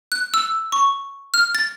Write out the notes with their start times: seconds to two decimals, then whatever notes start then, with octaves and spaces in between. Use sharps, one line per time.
0.12 F#6
0.34 E6
0.72 C#6
1.34 F6
1.55 A6